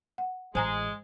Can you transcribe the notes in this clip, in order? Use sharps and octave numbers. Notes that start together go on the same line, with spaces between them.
F#5
A1 G#3 C5 G#5 A#5